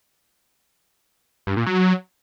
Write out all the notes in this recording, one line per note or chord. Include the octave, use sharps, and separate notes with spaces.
G2
A#2
F#3